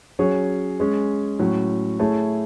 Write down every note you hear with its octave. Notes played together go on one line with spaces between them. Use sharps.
F#3 C#4 G#4 C#5
G#3 C#4 G#4
A2 F#3 C#4
A3 E4 G#4 C#5